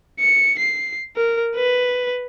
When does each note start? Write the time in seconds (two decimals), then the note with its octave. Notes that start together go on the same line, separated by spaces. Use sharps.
0.20 C#7
0.58 C7
1.16 A#4
1.55 B4